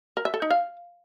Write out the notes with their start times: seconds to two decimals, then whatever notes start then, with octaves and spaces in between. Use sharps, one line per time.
0.17 A#4
0.25 E5
0.34 A4
0.42 D#4
0.50 F5